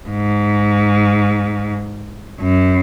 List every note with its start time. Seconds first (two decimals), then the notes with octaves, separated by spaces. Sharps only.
0.08 G#2
2.40 F#2